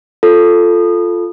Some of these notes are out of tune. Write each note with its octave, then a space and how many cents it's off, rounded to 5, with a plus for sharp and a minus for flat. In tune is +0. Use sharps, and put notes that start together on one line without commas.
F4 +0 A4 +0